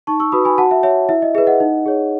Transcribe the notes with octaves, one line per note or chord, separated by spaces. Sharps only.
D#4 A5 C#6
C#6 E6
F#4 B4 B5 D#6
G#5 B5
F#4 F#5 A5
E5
C#5 E5
E4 E5
D#5
G#4 B4 E5
D#5 F#5
D#4
G#4 C#5